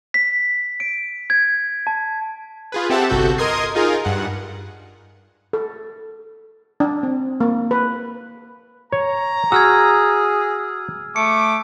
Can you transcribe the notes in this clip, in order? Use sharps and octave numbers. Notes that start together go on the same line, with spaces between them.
B6
D7
G#6
A5
F4 G#4 B4
C4 G4 A4 E5 F#5 A5
G1 C2 F#4 A4 G6
A#4 D#5 C6 D#6 G#6 C7
D#4 F4 G#4 A#4
G2 F#5
A4
D4
C4
A#3
B4
C#5 A#5
F#4 G#4 E6 F6 G#6
A3 D6 C#7